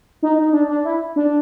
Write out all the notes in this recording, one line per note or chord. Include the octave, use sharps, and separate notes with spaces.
D#4
D#4
D4
D4
E4
D4